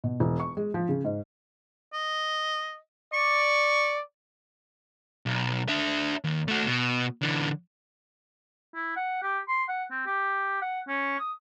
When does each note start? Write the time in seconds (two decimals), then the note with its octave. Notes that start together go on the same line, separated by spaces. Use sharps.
0.04 B2
0.20 E1
0.40 C#6
0.57 G#3
0.74 F3
0.89 C#3
1.05 G#2
1.93 D#5
3.13 D5 C#6
5.26 B1
5.68 D4 E5
6.24 D#2
6.48 A3 F#4
6.66 B2
7.22 D3 E3
8.75 E4
8.96 F#5
9.23 G4
9.48 C6
9.69 F#5
9.91 C4
10.06 G4
10.62 F#5
10.88 C#4
11.19 D#6